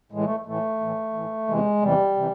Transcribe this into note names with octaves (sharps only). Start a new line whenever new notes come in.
A2 E3 G#3
A3
A2 E3 A3
A2 E3
A2 E3
E2 C3 E3 G#3
E2 C3 E3 G3
C3 E3